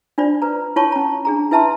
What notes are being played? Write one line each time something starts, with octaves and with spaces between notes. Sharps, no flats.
D4 F4 C5 D5
B4 A#5
E4 F4 C#5 A5 C#6
C#4 A#5
D4 G#4 A#5
E4 B4 E5 A5 A#5 C6